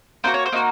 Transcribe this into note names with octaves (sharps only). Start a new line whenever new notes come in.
A#3 D#4 F#4 C5
C#5
C5
A#3 D#4 F#4